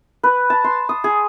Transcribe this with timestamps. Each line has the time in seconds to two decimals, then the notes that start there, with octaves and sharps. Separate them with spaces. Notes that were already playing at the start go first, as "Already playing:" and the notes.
0.23 B4
0.50 A5
0.64 C6
0.89 D#6
1.04 G#4